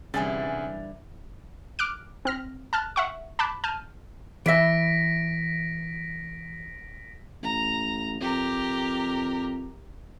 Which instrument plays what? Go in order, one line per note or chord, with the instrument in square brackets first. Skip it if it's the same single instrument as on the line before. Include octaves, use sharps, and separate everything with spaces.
[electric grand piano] C2 G#4 A6 [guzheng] D3 E3 G3 [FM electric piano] C#4 G#5
[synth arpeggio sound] D6 F6 F#6 D7
C4 F6 A#6
A5 F6 F#6 A6
E5 F#5 C#6
A5 B5 D6 F#6
A5 F6 G6 D#7
[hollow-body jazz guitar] E3 E5 [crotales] A#6 B6 D7
[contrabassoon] A1 [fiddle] A#5
[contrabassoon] F2 [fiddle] G4 A#4